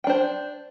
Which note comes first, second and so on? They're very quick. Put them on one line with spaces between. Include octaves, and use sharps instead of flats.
G5 D4 C5